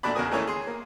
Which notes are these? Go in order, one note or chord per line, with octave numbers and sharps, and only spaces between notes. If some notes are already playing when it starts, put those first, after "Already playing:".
A#2 A3 D4 F#4 D5 B5
E2 C#3 F#4 A#4 G#5 D#6
D#3 E3 A3 A#3 C#4 C#5
G#4 C6
A#3